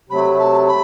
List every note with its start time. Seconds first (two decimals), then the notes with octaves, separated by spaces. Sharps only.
0.09 C3 F#3 A3 B5
0.38 A5
0.67 B5